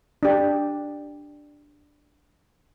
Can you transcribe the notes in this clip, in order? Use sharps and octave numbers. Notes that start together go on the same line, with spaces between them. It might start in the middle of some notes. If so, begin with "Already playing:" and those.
D4 G4